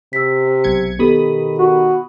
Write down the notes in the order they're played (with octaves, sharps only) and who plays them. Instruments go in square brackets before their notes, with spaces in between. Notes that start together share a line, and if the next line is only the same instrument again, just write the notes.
[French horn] C3 [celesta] E6 B6
[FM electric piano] B1 G#6 C#7
[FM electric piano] B2 B5 D#6 [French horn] D#3 [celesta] G4 A4
[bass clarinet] F#4